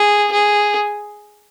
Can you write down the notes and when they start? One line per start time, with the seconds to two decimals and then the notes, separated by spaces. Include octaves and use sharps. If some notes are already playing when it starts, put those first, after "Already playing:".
Already playing: G#4
0.32 G#4